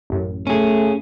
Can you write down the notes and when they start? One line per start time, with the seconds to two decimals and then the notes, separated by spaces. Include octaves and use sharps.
0.10 A1 F#2
0.47 A3 C#4 G#4